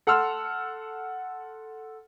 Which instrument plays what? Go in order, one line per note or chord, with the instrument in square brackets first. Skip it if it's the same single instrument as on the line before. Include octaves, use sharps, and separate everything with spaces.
[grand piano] A4 F#5 A5 C6 E6 F6